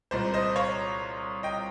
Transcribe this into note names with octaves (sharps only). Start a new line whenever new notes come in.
C2 A#2 G#3 C5
C5 D#5
C#5 F5
D#5 G5